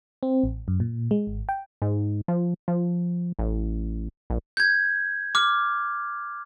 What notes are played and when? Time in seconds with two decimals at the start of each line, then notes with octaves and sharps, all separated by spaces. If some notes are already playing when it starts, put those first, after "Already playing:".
0.23 C4
0.44 A1
0.68 F#2
0.80 A#2
1.11 G#3
1.27 G#1
1.49 G5
1.82 G#2
2.28 F3
2.68 F3
3.39 A1
4.30 A#1
4.57 G6 G#6
5.35 D6 F6